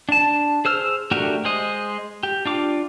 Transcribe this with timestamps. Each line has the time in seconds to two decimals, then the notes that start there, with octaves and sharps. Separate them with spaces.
0.09 D4 A5
0.65 G#4 C5 E6 F6
1.11 A3 D4 F#4 G4 A#4
1.45 G#3 C5 D#5
2.23 G4
2.45 D4 F4 D6